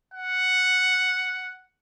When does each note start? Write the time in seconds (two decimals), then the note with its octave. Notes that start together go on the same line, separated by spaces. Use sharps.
0.14 F#5